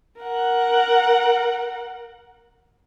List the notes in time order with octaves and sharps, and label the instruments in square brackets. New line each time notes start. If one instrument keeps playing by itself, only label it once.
[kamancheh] A#4 F#5